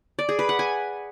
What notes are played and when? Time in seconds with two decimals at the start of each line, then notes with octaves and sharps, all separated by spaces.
0.19 D5
0.29 G#4
0.39 B4
0.49 F#5
0.59 G#5